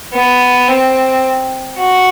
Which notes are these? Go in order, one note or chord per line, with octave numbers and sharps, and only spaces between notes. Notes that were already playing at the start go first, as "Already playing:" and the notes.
B3
C4
F#4